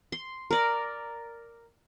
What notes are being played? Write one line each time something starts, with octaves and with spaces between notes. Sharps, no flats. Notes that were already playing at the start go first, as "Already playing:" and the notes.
C6
A#4 D5